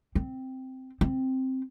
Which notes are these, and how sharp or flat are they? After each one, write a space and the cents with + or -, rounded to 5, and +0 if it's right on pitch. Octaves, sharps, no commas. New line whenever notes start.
C4 -5
C4 +0